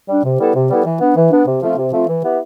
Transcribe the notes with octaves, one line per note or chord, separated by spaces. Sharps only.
G3 D4
C3
G3 B3 E4 A4
C3
G3 B3 E4 A4
E3
B3 D4
E3
B3 D4
C3
F3 A3 C4 F4
C3
F3 A3 C4 F4
E3
B3 E4 G4